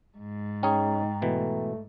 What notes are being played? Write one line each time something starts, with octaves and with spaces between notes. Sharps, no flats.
G#2
C#4 D#4 G#4 G5 A#5
B2 E3 A3